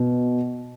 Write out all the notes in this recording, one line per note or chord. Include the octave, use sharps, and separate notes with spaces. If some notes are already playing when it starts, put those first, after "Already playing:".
Already playing: B2